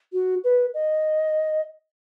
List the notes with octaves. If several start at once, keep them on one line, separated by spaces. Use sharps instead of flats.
F#4
B4
D#5